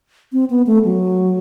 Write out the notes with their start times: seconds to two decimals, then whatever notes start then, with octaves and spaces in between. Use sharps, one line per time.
0.33 C4
0.50 B3
0.67 A3
0.85 F#3